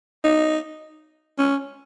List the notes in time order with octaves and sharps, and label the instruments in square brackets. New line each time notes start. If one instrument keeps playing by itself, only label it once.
[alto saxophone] D#4
C#4